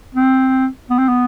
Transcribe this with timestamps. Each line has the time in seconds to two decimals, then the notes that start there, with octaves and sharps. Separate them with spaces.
0.15 C4
0.90 B3
0.99 C4
1.09 B3